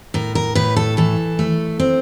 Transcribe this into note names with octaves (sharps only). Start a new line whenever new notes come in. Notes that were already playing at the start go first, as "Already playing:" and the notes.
A2 A#4
A#4
A2 B4
A4
E3 A4
A3
C4